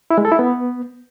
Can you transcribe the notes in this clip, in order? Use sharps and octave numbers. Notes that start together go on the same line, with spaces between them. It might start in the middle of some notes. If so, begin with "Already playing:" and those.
E4
G#3
A4
E4
B3